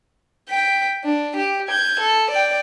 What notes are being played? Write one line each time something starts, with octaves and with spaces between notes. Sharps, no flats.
G5 B6
D4
G4
G6 G#6
A4
D5 G5